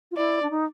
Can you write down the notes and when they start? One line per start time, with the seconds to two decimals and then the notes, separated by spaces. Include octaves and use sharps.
0.11 F4
0.17 E4 D5
0.42 D4
0.51 D#4